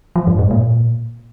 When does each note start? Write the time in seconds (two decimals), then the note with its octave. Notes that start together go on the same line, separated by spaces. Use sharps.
0.16 F3
0.27 G2
0.39 G#2
0.51 A#2